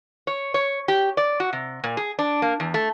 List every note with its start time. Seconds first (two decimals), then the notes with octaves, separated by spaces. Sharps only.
0.27 C#5
0.54 C#5
0.88 G4
1.17 D5
1.40 F#4
1.53 C3
1.84 A#2
1.97 G#4
2.19 D4
2.42 A#3
2.60 E2
2.74 A3